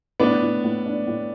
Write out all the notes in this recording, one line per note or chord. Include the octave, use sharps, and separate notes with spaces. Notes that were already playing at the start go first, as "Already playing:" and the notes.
A2 B3 D4
A2
A2
D4
A2